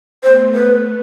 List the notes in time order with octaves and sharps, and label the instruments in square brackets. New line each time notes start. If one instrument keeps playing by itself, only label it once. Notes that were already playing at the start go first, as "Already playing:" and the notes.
[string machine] A3 B3 [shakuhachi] C5
[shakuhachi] B4